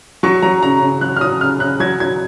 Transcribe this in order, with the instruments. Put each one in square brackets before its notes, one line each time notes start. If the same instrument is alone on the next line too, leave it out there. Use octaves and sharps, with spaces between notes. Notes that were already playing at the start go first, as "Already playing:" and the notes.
[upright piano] F#3 C#6
F#3 A#5
C#3 A#5
C#3
F#3 F#6
F6
F#3 D#6
C#3 F6
C#3 F#6
F#3 G#6
F#3 G#6